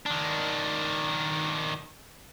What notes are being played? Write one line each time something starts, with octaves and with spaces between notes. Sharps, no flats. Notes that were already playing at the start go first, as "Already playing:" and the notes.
D#3 D4